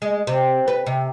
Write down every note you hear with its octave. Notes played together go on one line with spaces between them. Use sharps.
G#3
C3
B4
C3